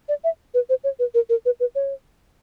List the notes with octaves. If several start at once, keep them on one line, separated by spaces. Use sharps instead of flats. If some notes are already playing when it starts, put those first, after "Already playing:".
D5
E5
B4
C5
C#5
B4
A#4
A#4
B4
B4
C#5